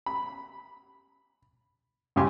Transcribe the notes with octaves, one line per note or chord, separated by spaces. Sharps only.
B5
G2 C#3 E4 G4 G#5 C6